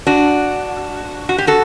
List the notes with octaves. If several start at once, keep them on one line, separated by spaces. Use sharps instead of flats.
D4 F#4
F#4
G4
F#4 A4